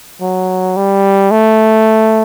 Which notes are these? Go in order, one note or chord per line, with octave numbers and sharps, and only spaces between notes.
F#3
G3
A3